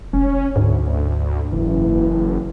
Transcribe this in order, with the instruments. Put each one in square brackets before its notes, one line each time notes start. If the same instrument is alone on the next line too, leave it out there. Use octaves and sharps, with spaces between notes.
[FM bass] F1 [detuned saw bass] C#4
[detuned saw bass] D2 [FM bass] G#2
[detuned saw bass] F#1 [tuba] E3